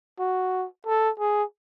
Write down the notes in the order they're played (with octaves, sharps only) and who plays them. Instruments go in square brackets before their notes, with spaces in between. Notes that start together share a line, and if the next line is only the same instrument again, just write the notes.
[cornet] F#4
A4
G#4